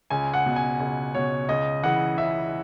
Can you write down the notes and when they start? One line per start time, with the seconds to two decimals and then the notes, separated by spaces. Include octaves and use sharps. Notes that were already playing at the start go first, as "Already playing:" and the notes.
0.10 C#2 G#5
0.34 F#5
0.46 B2
0.56 G#5
0.80 C#2
1.15 B2 C#5
1.49 C#2 D#5
1.83 C#3 E3 F#5
2.18 C#2 E5